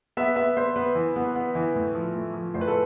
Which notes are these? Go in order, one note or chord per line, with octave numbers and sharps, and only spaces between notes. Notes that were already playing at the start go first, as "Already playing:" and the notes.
B3 E5
B3 E5
B3 C5
B3 B4
E3
B3
B3
E3
A2
F3
A3
F3
A2 C5
B4
A4